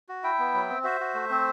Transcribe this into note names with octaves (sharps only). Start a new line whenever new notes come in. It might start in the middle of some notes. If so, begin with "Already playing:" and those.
F#4
E4 E5 G5
B3
F#3
C4
F#4 C5 E5
F#4
A3
C4